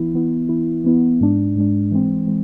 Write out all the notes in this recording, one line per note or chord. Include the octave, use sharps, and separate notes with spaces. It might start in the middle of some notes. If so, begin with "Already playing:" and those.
Already playing: E3 B3 E4
E3 B3 E4
E3 B3 E4
E3 B3 E4
G#2 G#3 D4
G#2 G#3 D4
E3 G#3 C4
E3 G#3 C4